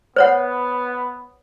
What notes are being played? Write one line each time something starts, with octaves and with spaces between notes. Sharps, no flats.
B3 C5 C#5 F#5